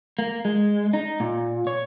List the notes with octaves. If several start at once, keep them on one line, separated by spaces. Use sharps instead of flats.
A#3
G#3
D#4
A#2
C#5